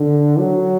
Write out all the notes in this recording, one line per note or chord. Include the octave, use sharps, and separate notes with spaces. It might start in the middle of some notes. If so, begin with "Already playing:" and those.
Already playing: D3
F#3